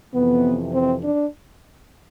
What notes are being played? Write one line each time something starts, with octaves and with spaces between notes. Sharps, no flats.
F2 C3 E3 B3
C4
D4